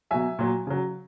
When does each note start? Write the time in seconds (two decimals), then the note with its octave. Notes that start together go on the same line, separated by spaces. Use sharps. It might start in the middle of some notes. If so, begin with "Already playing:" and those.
0.11 B2 F#3 E5 G#5
0.39 A#2 F#3
0.67 C#3 F#3